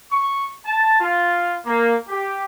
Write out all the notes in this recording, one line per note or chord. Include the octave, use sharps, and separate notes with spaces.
C#6
A5
F4
A#3
G4